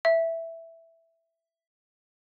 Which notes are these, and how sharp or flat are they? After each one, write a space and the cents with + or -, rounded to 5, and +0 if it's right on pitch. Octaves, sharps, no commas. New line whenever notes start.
E5 +0